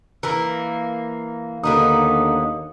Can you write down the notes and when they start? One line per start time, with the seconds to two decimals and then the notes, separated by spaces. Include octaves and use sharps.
0.23 E3 A#3
1.64 D#2 D3 B3 D#4 D#6